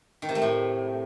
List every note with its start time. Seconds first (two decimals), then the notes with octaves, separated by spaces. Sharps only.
0.22 D#3
0.29 C3
0.35 A3
0.42 A2